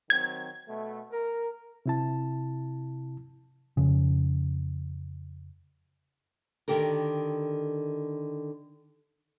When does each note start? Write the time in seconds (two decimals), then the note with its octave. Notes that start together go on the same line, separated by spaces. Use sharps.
0.10 D#3 F#3 C4 G#6
0.68 B2 A3
1.12 A#4
1.86 C3 E4 A5
3.77 F2 C#3
6.68 D3 D#3 G4 A4 A#4